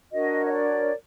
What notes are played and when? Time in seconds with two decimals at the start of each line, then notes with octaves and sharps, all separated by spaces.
0.13 D4 F#4 A#4 C#5 D#5
0.46 D#5
0.52 D5